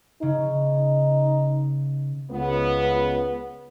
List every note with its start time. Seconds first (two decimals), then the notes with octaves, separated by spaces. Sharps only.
0.22 C#3 D#4
2.31 C#2 B3